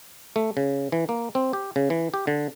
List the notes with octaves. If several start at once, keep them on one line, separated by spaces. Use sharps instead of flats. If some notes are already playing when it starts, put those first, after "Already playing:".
A3
C#3
E3
A#3
C4
G4
C#3
E3
G4
D3